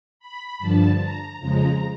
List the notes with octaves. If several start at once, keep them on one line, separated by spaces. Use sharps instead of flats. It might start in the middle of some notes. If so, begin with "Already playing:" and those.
B5
G2 D3 F3 A5
A#5
F2 C#3 F3 G#3 A#5